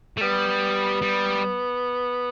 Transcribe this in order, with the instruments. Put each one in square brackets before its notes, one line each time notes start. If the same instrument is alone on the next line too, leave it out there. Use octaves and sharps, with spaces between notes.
[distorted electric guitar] A3
[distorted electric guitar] G3 [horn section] B3
[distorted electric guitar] G3